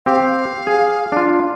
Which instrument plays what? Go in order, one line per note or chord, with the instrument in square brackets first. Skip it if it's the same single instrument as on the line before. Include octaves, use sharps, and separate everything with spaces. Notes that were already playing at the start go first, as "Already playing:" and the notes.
[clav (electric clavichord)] C4 G4 [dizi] F5
[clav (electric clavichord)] G#4
D4 F4